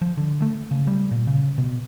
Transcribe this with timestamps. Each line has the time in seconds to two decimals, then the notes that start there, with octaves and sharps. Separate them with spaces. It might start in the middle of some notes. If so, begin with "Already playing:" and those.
0.02 F3
0.17 D3
0.42 A3
0.71 C#3
0.87 G3
1.11 A#2
1.27 C#3
1.58 B2